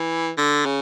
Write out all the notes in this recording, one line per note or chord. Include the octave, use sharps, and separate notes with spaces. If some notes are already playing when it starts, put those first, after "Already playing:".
Already playing: E3
D3
C#3